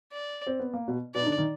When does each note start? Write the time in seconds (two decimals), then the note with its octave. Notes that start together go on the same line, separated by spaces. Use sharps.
0.12 D5
0.47 C4
0.60 B3
0.74 A#3
0.88 B2 B3
1.14 B2 B3 D5
1.21 D#4
1.26 D3 D4
1.37 D#3 D#4